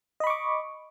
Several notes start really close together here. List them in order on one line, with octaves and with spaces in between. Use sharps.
D#5 B5 C#6 D6